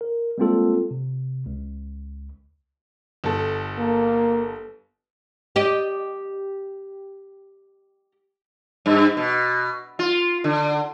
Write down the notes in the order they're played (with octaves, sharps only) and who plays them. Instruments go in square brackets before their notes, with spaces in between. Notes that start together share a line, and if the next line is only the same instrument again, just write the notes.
[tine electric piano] A#4
G3 G#3 A#3 C4 F4 A4
C3
C#2
[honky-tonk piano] G1 A4
[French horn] A#3
[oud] G4 D5 D#5
[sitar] G2
B2
F4
D3